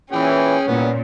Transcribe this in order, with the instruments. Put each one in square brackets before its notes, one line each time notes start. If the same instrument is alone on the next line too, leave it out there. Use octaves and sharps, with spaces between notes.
[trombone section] A#2 E3 [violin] C#4 [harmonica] G#4 G5
[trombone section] C2 [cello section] A#2 [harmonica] B3